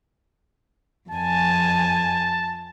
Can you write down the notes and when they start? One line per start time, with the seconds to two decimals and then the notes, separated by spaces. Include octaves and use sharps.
1.11 F2 G#5 A5